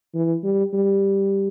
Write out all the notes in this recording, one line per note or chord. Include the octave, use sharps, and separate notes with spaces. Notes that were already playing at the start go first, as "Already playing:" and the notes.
E3
G3
G3